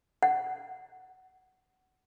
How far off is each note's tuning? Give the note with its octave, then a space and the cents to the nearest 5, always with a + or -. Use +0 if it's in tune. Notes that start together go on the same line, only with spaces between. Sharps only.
F#5 +15